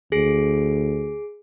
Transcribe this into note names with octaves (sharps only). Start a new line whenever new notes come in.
D2 G#4 C7 D7